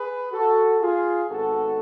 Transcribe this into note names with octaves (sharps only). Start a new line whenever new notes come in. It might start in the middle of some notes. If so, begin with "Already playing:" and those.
Already playing: G#4 B4
F#4 A4
F4 G#4
G#1 G#2 G#3 B3 F#4 A4